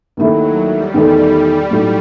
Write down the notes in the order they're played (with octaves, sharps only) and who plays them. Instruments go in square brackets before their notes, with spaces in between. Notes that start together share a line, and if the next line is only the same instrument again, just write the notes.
[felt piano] D#2 D#3 A3 E4 [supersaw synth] F#3
[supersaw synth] G3
[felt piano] E2 D#3 A3 D#4 A4
A2 F#3 A3 D#4 F#4